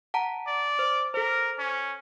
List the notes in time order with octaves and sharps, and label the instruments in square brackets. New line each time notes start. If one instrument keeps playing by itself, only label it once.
[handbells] F#5 A5 A#5
[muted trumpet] D5
[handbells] C5
[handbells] A4 C5 [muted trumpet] A#4
[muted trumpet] C#4